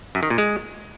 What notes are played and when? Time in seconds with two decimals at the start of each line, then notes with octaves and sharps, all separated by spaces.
0.15 F#2
0.23 D#3
0.30 A#2
0.38 G#3